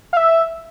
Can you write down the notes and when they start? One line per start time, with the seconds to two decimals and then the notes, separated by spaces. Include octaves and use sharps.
0.13 F5
0.17 E5